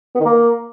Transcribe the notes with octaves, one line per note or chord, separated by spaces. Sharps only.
B3
D#3
A#3